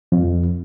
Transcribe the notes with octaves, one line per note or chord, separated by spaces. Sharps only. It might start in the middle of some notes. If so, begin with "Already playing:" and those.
F2